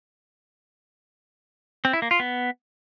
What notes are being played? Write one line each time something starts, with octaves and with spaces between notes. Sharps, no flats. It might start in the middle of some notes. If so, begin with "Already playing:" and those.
C4
E4
A#3
F4
B3